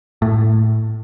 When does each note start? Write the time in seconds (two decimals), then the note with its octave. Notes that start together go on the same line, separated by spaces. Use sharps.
0.22 A2